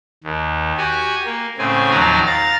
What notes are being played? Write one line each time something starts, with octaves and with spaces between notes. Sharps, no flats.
D#2
F#4 G4 G#5
A#3
A2 C#3 C4 G#5
D#2 F3 F#3 D5 A#5
F5 A#5 A6